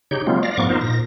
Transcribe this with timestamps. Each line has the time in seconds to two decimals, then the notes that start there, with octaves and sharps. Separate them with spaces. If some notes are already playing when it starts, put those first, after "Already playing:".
0.11 C#3 D#4 G4 C#5 G6
0.27 F#3 G#3 A#3 C4 F4
0.43 D5 F5 A#6
0.57 G#2 F3 A#3 B3 C#6 D6
0.69 D#4 F4 A#4 C5
0.81 A#2 A#6